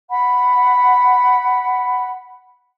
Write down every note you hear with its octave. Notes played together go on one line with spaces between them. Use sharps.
F#5 B5